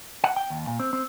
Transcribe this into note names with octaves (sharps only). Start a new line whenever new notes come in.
F#5
G5
D#2
A#2
C4
C4